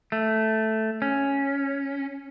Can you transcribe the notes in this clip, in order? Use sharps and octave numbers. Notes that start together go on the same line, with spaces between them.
A3
C#4